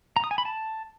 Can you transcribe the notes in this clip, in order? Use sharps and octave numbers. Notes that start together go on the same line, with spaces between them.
A#5
D#6
G#5
B5
A5